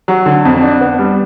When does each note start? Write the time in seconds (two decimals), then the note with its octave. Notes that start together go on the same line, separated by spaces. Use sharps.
0.08 F#3
0.26 D3
0.45 F2
0.62 D4
0.81 B3
0.99 G3